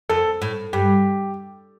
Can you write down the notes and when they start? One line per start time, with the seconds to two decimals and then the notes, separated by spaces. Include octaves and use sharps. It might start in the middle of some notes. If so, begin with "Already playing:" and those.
0.09 F2 A4
0.42 A2
0.73 G2 G4